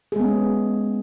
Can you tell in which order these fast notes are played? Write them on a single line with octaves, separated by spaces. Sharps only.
G#4 G#3 B3 C#4